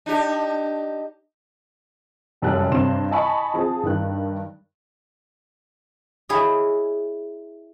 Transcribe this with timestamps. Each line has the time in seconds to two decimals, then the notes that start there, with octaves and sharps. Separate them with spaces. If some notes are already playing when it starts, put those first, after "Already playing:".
0.06 D4 D#4 G4
2.42 F1 F#2 G3 A5 F#6
2.71 G2 C3 C4 C6 E7
3.11 D#5 G#5 A5 B5 C#6
3.54 F3 C4 G#4 A5
3.83 G2 D#3 F#6
6.29 E4 G#4 C#5 D#5